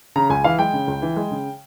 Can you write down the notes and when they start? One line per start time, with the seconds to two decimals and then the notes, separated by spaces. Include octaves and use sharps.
0.16 C#3 A#5
0.30 C#2 G#5
0.44 E3 F5
0.58 G#3 G5
0.73 C#3
0.88 C#2
1.02 E3
1.16 G#3
1.31 C#3